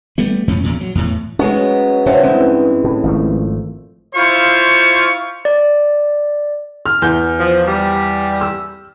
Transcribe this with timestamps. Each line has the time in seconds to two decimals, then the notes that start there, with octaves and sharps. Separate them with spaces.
0.18 G3 A3 B3
0.48 F2 A2 F3 C#4
0.64 E2 A#2
0.81 F#3
0.95 E2 A2
1.39 F#3 G#3 B3 C#4
2.06 G2 C#3 F#3 C#4 C5 E5 F#5
2.23 E3 G#3 C4 C#4
2.84 A2
3.03 G#1 F3 A3
4.15 E4 F4 C5 F5 C#6
5.45 D5
6.86 F6
7.02 E2 G6
7.39 F3
7.68 G3
8.41 E6